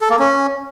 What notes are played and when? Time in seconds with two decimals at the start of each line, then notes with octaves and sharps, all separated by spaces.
0.01 A4
0.10 A#3
0.19 C#4